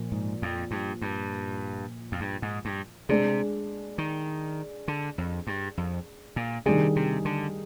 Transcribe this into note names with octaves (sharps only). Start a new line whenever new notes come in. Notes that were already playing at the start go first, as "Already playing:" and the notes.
Already playing: A#2 F3 A#3
G#2
F2
G2
G2
F2
G2
G#2
G2
C3 G#3 D4 G#4
D#3
D3
F2
G2
F2
A#2
C3 D#3 G3 D4 G#4
C3
D3